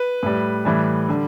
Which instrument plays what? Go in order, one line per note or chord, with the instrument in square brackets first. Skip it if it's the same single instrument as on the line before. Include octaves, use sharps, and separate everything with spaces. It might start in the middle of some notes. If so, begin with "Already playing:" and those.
Already playing: [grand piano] B4
A2 G3
A2 E3 G3
D3 G3